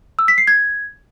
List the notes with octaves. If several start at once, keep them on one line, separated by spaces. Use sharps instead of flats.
E6
B6
C7
G#6